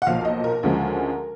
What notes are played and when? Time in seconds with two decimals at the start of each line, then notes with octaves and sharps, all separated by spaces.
0.02 F#5
0.06 B1 A#2 F3 F5
0.25 D#5
0.44 A#4
0.63 D2 C#3 F3 G#3